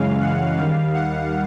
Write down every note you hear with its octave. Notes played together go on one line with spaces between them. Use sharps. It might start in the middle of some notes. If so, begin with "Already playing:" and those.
Already playing: F#2 C#3 E3 G#3 C#4 F5
F#5
D#2 D#3 G3 F5
F#5